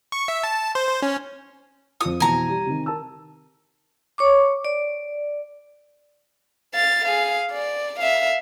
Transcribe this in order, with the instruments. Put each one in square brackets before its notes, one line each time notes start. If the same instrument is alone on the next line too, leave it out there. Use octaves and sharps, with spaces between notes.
[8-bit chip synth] C#6
E5
A5
C5
C5
C#4
[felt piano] F2 F4 [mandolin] D#6
[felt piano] F2 B2 E3 [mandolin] G#5 A#5
[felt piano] G3
C3 D#3
A#4 A5 E6
[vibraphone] C#5 C#6 D6
D5
[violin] F5 A6
G#4 F5
D5
E5 F5